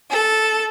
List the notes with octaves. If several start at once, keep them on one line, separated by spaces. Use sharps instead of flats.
A4